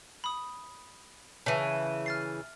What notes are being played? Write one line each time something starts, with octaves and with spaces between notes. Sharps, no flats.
B5 D#6
C#3 E3 E5 A5
F6 A6 C7